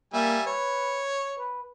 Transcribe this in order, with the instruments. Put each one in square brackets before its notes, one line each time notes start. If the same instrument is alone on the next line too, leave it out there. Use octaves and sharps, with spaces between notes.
[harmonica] G3 E5 G#5 [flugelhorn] A#3
[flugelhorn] B4 [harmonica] C#5
[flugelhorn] B4